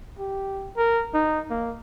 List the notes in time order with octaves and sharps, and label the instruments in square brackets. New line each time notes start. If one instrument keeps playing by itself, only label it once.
[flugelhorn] G4
A#4
D#4
A#3